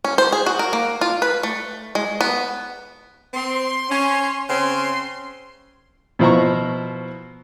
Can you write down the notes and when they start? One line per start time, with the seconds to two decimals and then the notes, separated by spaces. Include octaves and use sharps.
0.04 C#4
0.18 C5
0.32 G#4
0.46 F#4
0.59 A#4
0.73 A#3
1.01 F4
1.22 B4
1.43 A3
1.95 G#3
2.21 B3
3.34 C4 C6
3.90 C#4
4.49 C#3 C4 C#4 C6
6.19 B2 F3 E4 C5 A#5 C#6